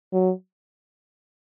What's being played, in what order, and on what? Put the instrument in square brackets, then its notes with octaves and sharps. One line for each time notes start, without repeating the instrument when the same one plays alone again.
[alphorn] F#3